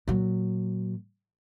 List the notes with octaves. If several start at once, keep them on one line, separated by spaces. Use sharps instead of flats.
A#2 F#3